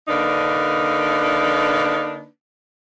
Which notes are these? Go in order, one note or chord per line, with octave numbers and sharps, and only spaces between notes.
D3 A#3 D4 D#4 B4